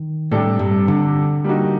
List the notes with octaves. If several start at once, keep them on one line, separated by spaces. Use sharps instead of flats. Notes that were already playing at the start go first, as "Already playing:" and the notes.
Already playing: D#3
A2 C3 G3 D4 A4
G2
D3
G3 A#3 D#4 F#4